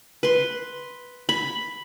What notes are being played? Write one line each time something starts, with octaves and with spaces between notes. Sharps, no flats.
B4 C6
B5